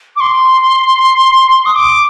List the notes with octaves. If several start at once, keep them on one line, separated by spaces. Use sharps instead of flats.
D6
C6
D#6
D6